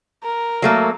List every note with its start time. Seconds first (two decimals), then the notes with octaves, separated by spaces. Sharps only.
0.24 A#4
0.62 F#3 A3 A#3